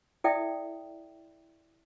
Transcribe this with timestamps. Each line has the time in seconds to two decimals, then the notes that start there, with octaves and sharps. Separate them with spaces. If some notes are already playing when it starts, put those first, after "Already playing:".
0.24 E4 A4 D5 E5 G5 D#6